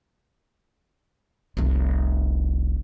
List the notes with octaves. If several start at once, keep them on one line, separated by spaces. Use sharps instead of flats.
F1 C2